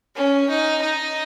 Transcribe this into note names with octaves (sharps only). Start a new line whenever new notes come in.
C#4
D#4
D#4